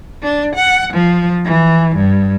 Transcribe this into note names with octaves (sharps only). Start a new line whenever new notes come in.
D4
F#5
F3
E3
G2